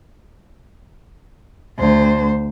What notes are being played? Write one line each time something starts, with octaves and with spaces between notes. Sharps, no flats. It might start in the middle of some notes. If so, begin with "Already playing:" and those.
D2 C5